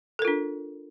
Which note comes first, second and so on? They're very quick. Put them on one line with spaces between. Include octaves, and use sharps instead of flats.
A4 A#4 F4 D4